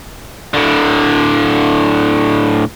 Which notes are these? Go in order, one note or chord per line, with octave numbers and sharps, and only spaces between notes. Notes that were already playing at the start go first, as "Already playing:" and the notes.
A2 D3